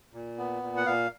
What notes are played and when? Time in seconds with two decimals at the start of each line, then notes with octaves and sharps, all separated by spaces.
0.14 A#2
0.38 B3
0.63 A#2
0.77 F#5
0.86 A#2 F5